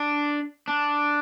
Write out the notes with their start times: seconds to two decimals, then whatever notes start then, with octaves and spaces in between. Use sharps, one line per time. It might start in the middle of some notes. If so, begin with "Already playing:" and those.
Already playing: D4
0.68 D4